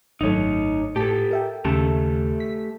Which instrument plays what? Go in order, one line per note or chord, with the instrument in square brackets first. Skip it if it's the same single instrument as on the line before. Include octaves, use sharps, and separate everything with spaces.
[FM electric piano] G#1 F#2 A3 [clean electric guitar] D#4 C#5
[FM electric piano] A2 A5 B6 [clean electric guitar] G4 A4
[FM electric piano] A#4 E5 G5
[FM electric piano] D#2 C#3 [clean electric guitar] A3 G4 A4
[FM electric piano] B6